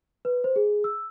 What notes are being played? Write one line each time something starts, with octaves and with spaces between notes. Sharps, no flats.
B4
C5
G#4
E6